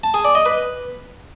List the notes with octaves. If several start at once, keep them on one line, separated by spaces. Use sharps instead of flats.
A5
G#4
D5
D#5
B4